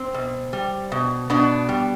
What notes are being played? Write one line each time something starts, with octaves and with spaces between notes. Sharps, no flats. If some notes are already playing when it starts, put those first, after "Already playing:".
Already playing: C4
B2
G3
B2
B2 B3 D4
G3